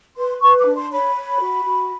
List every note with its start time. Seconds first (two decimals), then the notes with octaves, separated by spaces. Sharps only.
0.16 B4 C6
0.41 B4 C#6
0.58 D6
0.66 D4
0.75 C6
0.91 C#5 B5
1.16 C#5
1.41 F#4
1.65 F#4